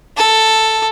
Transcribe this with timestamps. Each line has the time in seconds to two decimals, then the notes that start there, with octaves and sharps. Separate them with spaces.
0.17 A4